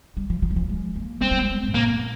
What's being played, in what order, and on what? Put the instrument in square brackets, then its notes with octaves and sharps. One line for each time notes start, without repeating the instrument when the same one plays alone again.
[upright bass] G3
F3
F3
G3
F3
G#3
A#3
[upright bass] G#3 [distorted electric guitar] C4
[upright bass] G3
G#3
G#2
[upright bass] A#2 [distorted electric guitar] A#3